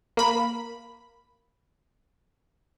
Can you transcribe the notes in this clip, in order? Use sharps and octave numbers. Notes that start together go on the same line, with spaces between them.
A#3 B5